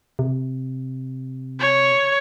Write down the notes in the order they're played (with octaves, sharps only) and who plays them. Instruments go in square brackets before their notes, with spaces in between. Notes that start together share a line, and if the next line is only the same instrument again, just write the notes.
[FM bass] C3
[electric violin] C#5